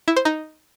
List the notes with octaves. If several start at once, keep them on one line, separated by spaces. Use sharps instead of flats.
E4
C5
D#4